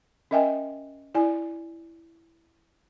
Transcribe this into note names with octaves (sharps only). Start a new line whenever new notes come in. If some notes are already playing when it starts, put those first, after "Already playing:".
C#4 A#4 D#5 E5 G5 G#5
E4 D5 G#5